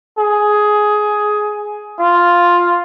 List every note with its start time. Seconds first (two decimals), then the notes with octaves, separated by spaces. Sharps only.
0.18 G#4
1.99 F4